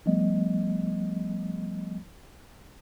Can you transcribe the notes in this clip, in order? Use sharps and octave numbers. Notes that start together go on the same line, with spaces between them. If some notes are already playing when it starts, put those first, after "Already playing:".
F3 G3 A3 B3 D#5